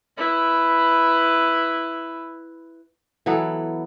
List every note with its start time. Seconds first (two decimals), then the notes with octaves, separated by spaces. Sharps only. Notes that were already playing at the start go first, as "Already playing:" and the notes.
0.17 E4 B4
3.26 E3 F#3 B3 A4